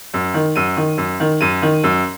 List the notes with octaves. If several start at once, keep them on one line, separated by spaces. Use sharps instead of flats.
F#2
D#3
F#2 D#7
D#3
F#2
D#3
F#2 D#7
D#3
F#2